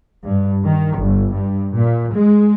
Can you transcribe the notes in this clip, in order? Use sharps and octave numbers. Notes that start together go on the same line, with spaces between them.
G2
D#3
G1
G2
A#2
G#3